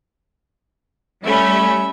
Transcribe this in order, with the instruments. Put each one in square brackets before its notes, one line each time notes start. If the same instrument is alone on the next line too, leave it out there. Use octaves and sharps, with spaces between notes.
[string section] G3 A3 C#4 [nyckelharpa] E5 B5